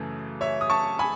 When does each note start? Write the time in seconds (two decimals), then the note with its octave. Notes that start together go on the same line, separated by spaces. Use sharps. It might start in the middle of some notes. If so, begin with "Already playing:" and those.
Already playing: F#2 C#3 E3 A3
0.41 C#5 E5
0.61 D#6
0.70 A5 C#6
0.99 G#5 B5